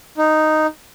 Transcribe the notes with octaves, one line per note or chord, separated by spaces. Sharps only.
D#4